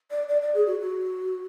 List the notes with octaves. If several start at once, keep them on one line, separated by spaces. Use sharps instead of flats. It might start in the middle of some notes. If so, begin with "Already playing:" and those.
D5
D5
D5
G#4
F#4
F#4